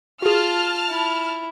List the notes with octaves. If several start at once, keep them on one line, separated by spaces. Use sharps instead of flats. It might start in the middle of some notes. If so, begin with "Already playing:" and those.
F4 F#4 G#4 A5 F6
E4